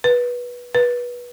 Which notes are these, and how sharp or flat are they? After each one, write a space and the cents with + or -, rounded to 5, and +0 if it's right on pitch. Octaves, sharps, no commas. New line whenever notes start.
B4 -20
B4 -25